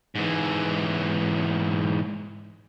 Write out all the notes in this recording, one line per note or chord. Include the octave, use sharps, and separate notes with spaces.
G#2 E3